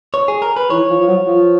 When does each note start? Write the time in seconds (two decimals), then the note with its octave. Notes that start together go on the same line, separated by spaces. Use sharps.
0.14 C#5
0.28 G#4
0.42 A#4
0.56 B4
0.70 E3 C#5
0.90 F3
1.02 F3
1.08 F#3
1.27 F3